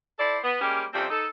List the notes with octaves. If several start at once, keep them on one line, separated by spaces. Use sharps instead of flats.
E4 A4 C5 D5
B3
G3 G#3 A#3 C#4 G4
F2 C3 G3 C4 C#4
D#4 A4